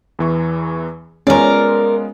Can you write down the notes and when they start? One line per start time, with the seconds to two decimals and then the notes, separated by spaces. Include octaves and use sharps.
0.19 E2 E3 C#6
1.27 G#3 B3 C#4 F4 A#4 D5